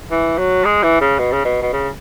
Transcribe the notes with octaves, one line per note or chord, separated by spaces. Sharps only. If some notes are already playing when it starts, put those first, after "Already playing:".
E3
F#3
G#3
E3
C#3
B2
C#3
B2
B2
C#3